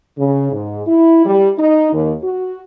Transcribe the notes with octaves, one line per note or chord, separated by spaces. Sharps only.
C#3
G#2
E4
G3
D#4
D#2
F#4